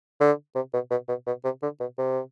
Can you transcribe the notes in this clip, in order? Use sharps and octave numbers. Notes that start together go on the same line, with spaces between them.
D3
C3
B2
B2
B2
B2
C3
D3
B2
C3